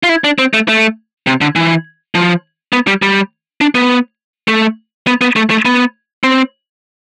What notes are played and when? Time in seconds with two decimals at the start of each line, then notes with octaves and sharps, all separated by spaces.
0.03 F4
0.09 E4
0.24 D4
0.39 C4
0.54 A3
0.68 A3
1.27 C3
1.41 D3
1.56 E3
2.15 F3
2.73 B3
2.87 G3
3.02 G3
3.61 D4
3.75 B3
4.48 A3
5.07 B3
5.21 B3
5.36 A3
5.50 A3
5.65 B3
6.24 C4